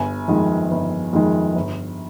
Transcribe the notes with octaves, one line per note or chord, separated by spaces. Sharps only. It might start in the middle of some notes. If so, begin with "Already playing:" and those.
Already playing: G1 G#5
F2 D#3 G#3
G1
F2 D#3 G#3
G1